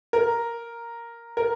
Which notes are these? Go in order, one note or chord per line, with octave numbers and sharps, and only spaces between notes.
A#4
A#4